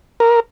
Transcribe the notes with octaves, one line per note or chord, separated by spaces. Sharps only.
A#4